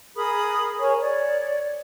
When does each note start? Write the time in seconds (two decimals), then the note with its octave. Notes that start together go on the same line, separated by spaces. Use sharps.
0.16 G#4 A#4 B5 D#6
0.79 A#4 C#5 G#5 C#6
1.00 C#5 D5